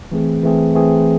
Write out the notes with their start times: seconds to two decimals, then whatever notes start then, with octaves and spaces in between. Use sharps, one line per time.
0.11 E3 A3 C4 G#4
0.43 E3 A3 C4 G#4
0.75 E3 A3 C4 G#4